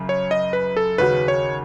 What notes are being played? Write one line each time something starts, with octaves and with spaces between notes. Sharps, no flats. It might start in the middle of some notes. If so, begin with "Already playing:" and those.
Already playing: F#2 C#3
C#5
D#5
B4
A4
D#2 C#3 F#3 C#4 F#4 B4
C#5